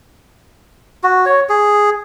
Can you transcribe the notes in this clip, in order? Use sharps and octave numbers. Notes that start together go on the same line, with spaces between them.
F#4
C#5
G#4